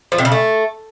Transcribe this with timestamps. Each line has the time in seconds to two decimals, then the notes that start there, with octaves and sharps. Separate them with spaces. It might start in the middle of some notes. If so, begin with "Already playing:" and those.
0.12 F3
0.18 C3
0.25 C#3
0.32 A3